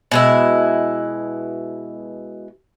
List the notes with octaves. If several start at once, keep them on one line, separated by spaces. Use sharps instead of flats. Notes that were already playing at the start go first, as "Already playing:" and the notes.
B2 G#3 E4